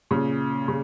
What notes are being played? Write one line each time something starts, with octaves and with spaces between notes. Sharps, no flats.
A#2 C#3
C#3